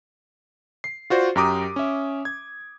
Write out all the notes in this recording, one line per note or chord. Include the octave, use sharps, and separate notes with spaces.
C7
F4 F#4 C5 D5
F#2 G4 A#5 D6 D#6
C#4 E5
G#6